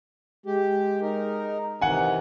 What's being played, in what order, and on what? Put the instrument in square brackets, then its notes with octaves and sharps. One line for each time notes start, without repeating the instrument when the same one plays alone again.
[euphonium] G#3 [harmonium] G4
[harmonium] D#4 A#4
[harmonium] C3 D#3 E3 [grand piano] F#5 G#5